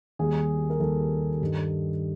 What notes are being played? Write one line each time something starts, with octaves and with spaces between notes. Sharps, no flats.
D#2 D#3 G3 G#4
A#4
D#2 D#3 G3 A4
G2 D#3 G3